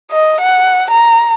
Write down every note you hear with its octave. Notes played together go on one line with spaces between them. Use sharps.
D#5
F#5
A#5